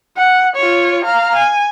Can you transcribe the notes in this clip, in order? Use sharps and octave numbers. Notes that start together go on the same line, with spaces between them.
F#5
F4 C#5
F5 A#5
G#5